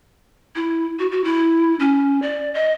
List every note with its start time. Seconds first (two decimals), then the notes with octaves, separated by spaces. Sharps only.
0.56 E4
0.99 F#4
1.12 F#4
1.24 E4
1.80 C#4
2.22 D5
2.54 D#5